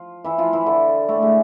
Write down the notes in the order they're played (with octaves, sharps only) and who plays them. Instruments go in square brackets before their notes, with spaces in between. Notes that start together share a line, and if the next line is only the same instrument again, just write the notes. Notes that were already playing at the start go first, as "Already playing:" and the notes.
Already playing: [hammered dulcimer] F3 F4
E3 E4
F3 F4
E3 E4
D3 D4
A2 A3
G#3